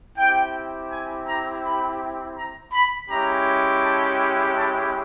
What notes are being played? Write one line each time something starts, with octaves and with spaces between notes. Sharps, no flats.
C4 E4 G4 G5
G#5
A#5
B5
A#5
B5
G#3 C#4 E4 G4 A#5
A5
A5